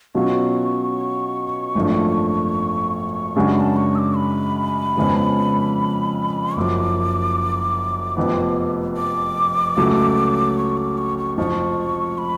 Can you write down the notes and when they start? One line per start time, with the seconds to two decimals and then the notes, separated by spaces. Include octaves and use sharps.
0.15 B2 F#3 C#4 F4 C#6
1.75 G#1 F#2 F3 A3 D4
3.36 F#2 C#3 G#3 D4 F#4
3.55 B5
3.60 A5
3.76 C#6
3.95 E6
3.98 D6
4.16 B5
4.96 F2 C#3 F3 G#3 B3
6.56 F#1 F#2 F3 D6
8.17 F1 F2 F3 B3
8.97 D6
9.77 C#2 C#3 F#3 A3
10.58 C#6
10.77 D6
10.98 C#6
11.18 C#6
11.37 F1 F2 F3 C#6
12.18 B5